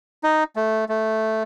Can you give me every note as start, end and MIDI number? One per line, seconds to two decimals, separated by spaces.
0.24 0.44 63
0.56 0.85 57
0.89 1.43 57